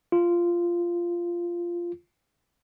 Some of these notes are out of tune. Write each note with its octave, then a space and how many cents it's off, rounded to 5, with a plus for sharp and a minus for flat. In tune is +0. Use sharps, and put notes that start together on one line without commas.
F4 -10